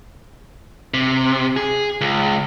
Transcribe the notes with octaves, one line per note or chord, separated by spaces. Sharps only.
C3
G#4
C#2